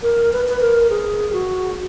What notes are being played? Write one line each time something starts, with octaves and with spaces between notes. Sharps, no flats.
A#4
B4
B4
A#4
G#4
F#4